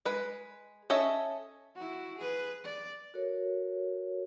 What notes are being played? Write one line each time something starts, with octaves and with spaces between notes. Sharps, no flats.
G#3 B4
C#4 A4 D#5 E5
E4 F#4
G#4 B4
D5
F#4 A4 A#4 C#5